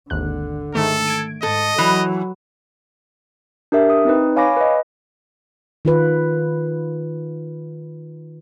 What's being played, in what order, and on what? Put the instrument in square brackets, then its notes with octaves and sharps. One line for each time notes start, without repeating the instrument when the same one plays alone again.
[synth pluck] G#1 D#2 F#6 [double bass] D3
[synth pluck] G#2 D#3 A3 [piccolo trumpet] A4
[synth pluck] G#6 D7
[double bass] G#2 [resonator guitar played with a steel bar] A4 [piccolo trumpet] D#5
[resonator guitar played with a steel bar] E3 [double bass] F#3
[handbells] D4 G4 A#4 E5
D#6
C4 D#4 B4
C#5 F5 G#5 B5 D6 A#6
B4 D#5
[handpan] D#3 F4 B4